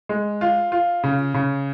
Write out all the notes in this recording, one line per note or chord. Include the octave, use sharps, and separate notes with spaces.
G#3
F4
F4
C#3
C#3